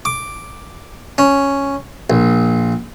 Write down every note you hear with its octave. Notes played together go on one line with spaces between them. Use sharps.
D6
C#4
A#1